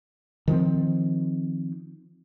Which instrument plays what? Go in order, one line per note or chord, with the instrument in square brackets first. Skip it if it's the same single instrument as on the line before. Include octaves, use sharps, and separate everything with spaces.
[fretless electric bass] D#3 F3 A3 C4